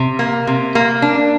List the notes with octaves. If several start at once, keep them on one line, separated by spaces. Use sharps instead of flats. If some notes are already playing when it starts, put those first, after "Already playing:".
Already playing: C3
A#3
C3
A#3
D4